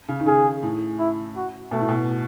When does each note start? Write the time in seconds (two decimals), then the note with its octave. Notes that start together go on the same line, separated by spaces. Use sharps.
0.08 C#3
0.20 D#3
0.26 C#3 G#4
0.63 A2
0.99 E4
1.36 F#4
1.71 B2 A3
1.80 A2
1.89 B2